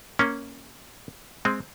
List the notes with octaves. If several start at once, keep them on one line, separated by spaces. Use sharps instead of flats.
A#3 C#4
G#3 C4